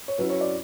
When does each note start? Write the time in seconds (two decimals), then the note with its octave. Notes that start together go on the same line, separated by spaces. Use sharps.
0.08 C#5
0.18 F#3 C#4 E4 B4
0.30 C#5
0.41 D5